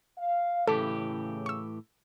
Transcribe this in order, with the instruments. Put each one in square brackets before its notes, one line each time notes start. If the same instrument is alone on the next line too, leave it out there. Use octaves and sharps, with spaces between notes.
[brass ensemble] F5
[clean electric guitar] A2 E3 G4 [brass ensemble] C#3 [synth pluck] A4 B6
[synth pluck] C#6 E6